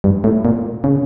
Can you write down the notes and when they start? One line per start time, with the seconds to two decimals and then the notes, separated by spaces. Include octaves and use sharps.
0.04 G2
0.24 A2
0.45 A#2
0.84 C#3